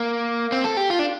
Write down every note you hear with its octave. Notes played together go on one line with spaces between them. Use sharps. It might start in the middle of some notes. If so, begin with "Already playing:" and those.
Already playing: A#3
C4
A4
G4
F4
D4